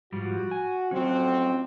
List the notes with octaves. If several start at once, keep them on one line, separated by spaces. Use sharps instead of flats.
G#2 F3 G3 F#4
G#5
F2 A2 F#3 C4 C#4 F#4